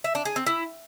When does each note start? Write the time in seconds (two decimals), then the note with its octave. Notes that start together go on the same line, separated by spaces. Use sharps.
0.04 E5
0.15 D4
0.25 G#4
0.36 C4
0.46 E4